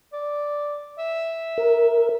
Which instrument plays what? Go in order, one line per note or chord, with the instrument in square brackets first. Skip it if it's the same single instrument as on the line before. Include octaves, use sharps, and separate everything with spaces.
[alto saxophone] D5
E5
[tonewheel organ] A#4